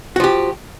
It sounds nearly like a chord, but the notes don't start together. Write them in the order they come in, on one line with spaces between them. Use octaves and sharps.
F#4 F3 G4